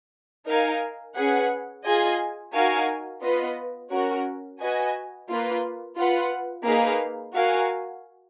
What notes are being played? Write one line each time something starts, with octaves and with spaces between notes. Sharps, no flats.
D#4 A#4 F5 G#5
C#4 G#4 B4 F#5
F4 G#4 D#5 G#5
D#4 F#4 A#4 F5 G#5
B3 F4 B4 D#5
C#4 F#4 A#4
F#4 B4 D#5 G#5
A#3 F4 B4
F4 B4 F#5
A#3 D#4 G#4 B4 F5
F#4 A#4 F5 G#5